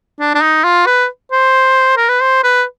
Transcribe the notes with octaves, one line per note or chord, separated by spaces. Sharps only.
D4
D4
D#4
F4
B4
C5
A#4
B4
C5
B4